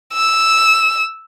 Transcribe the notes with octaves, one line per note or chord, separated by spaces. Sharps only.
E6